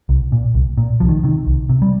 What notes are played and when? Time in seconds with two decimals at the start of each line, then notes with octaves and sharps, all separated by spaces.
0.09 C2
0.32 A#2
0.55 C2
0.77 A#2
1.00 C2 F3
1.09 D#3
1.23 C3 D#3
1.47 C2
1.69 C3
1.82 G3